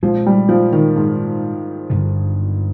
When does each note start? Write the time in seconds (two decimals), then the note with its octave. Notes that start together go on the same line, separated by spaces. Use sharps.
0.03 A#2 F3 G#3 C4
0.26 G3
0.49 F3
0.73 D#3
0.96 G#2
1.90 G2 D3 F3